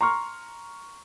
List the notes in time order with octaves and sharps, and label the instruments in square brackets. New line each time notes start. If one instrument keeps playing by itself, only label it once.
[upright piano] A#5 C6 C#6 F6